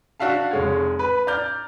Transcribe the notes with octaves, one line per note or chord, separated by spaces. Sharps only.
D4 F#4 E5 F5 A5
F1 G#3 C#5
B4
D5 A#5 F6 G6